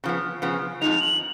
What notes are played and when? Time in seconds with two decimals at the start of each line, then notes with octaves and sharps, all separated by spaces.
0.04 C#3 F3 B3
0.42 C#3 F3 B3
0.81 F2 F3 G#3 D#4 F7
1.00 F#7